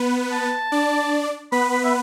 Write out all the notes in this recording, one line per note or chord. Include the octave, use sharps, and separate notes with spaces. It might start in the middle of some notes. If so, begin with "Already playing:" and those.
Already playing: B3 B4
A5
D4 D5
B3 B4 B5
B5
E5